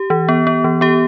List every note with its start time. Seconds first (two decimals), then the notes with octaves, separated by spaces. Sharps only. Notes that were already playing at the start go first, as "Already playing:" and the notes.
Already playing: G4
0.10 E3
0.29 B3
0.47 B3
0.64 E3
0.81 B3 G4